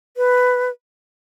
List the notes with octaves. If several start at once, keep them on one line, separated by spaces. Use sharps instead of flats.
B4